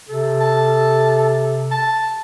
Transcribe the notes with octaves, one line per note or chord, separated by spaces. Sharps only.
C3 A4
A5
A5